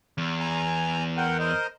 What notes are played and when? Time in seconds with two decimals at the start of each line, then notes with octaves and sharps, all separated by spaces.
0.18 E2
0.40 G#5 A#5
1.17 A#4 F#5 G5
1.39 A#4 C5 D#5